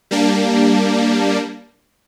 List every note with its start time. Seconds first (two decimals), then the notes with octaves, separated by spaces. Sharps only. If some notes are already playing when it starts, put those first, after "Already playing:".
0.11 G3 A#3 D4